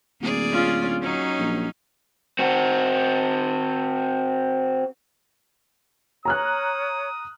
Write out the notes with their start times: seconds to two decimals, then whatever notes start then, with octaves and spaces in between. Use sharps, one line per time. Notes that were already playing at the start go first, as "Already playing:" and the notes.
0.21 D1 A#3 G#4 D5
0.52 C#4 F4
1.02 F#3 C#4 D#4
1.38 A#1
2.39 C4 F#4
6.25 C#5 A#5 D#6 F6 F#6